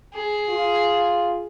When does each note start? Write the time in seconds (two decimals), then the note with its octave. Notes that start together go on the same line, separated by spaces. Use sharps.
0.14 G#4
0.49 F4